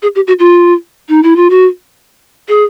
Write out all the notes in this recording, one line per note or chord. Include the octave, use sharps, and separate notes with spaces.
G#4
G4
F#4
F4
D#4
E4
F4
F#4
G#4